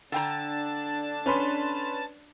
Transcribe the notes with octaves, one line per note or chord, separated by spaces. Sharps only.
D3 D4 G5 A5 A#5
C#4 B4 C6